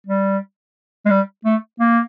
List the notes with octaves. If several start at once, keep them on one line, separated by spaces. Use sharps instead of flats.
G3
G#3
G3
A3
A#3